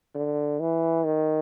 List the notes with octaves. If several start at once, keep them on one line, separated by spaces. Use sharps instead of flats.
D3
E3
D#3